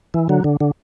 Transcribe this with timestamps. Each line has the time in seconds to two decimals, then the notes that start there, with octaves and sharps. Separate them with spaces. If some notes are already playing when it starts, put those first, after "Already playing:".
0.14 E3
0.29 D3 F#3
0.44 D3
0.61 D3